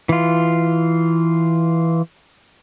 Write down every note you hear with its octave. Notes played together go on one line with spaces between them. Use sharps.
E3 F4